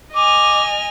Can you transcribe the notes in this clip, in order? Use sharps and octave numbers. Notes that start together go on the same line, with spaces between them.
D#5 G#5 D6 F6